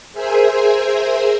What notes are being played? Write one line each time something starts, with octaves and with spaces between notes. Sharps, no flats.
G#4 A#4 C5 E5 G#5